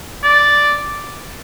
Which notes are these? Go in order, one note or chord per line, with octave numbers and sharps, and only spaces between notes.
D5